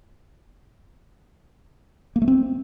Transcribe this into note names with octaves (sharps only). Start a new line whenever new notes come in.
A#3
A3
C4